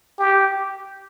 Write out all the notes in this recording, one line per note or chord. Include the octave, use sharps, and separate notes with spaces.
G4